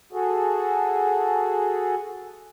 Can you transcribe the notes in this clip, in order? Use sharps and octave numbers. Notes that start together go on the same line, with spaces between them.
F#4 G#4 A4